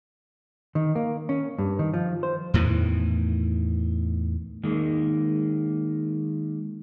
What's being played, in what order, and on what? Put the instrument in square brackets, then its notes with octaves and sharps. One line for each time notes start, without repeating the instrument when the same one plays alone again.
[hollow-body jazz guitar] D#3
A#3
C#4
G2
D#3
F3
C5
[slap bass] E2 A2 D#3 E3
[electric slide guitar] D#3 G#3 A#3